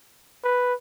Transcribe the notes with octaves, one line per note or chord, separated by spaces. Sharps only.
B4